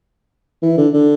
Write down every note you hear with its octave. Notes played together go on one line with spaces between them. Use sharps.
E3
D3
D3